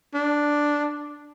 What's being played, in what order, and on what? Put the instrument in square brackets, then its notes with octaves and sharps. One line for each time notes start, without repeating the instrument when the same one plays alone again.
[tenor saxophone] D4